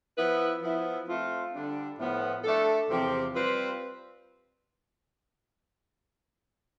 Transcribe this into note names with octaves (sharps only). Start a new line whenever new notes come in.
F3 B3 E4 B4
F3 B3 E4
A3 C4 F4
D3 G3 D4
A2 F3 B3
A3 D4 A4
E2 C3 F3 C4 G4
G3 C4 F4 B4